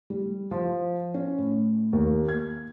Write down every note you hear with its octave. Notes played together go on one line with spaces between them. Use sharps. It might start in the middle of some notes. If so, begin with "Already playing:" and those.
G3
F3
C#4
A2
D#2
G#6